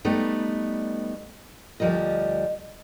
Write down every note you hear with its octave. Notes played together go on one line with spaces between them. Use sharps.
G3 A3 B3 D#4
D2 F3 G3 A#4 D#5